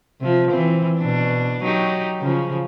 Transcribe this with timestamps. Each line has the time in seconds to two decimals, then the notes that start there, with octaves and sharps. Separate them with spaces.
0.21 C3 F3
0.51 E3 C4
1.00 B2 D4
1.64 F#3 D#4 G4
2.21 C#3 F3